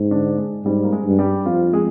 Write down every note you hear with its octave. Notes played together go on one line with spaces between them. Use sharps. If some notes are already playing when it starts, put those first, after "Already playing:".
Already playing: G#2
D3 D4
G#3
G#2 G3
A#3
G#3
G2
G3 G4
F2 F3 F4
G#3 G#4